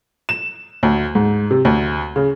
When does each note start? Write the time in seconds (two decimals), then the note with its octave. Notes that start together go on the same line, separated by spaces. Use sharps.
0.29 E7
0.83 D2
1.15 G#2
1.51 C3
1.65 D2
2.16 C#3